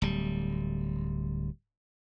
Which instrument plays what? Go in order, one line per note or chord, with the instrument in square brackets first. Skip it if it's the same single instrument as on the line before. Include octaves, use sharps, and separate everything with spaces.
[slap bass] D1 G3